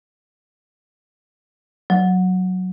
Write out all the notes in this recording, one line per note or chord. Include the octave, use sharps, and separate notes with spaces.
F#3